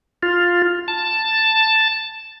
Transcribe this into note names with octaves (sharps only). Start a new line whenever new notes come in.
F4
A5